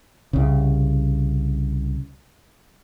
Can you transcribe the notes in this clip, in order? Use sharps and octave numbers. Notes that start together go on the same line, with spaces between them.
C2 C#3